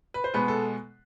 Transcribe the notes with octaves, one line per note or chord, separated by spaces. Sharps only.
B4
C5
B2 G#3 B3 B4
A4